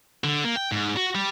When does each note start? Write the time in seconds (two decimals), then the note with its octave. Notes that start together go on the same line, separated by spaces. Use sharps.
0.24 D3
0.44 A#3
0.56 G5
0.72 G#2
0.96 F#4
1.15 G3